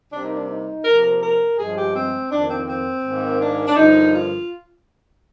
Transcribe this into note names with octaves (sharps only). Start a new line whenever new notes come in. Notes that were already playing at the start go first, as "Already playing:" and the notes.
C3 G3 A#3 D4
D#4
D4
D#4
C3 F3 A#3 A#4
A#4
A#4
G2 F3 G#3 G#4
G4
C4
F2 D#3 A#3 D4
C4
C4
G#2 D#3 A#3
D4
D4
G2 D3 F3 A#3 D#4
F4